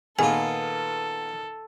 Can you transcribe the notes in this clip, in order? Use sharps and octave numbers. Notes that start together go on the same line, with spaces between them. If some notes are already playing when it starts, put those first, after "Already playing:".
A#2 D#3 B3 F4 G#4 A4 G#5